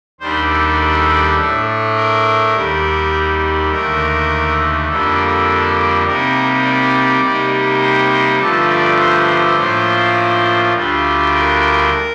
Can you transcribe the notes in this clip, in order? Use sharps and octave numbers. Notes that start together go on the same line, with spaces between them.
D#2 D#3 G3 D4 C5
A4
A4
A2 A3 D4
A#4
D#2 D#3 G3
D#2 D3 A3 A#4
F2 D3 G3 A#3 D4 A4
C3 G3 A#3 D#4 A#4
D5
C3 G3 A#3 D#4
C5
C5
G2 D3 F3 A3 A5
D5
C5
A2 F3 A#3 D4 F4
D2 D3 G3 D4 F4
A#4